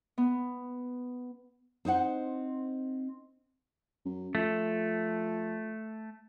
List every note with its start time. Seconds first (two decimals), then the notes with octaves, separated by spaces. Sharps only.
0.18 B3
1.85 C4 D#4 C5 F#5
4.05 F#2
4.35 F3 A3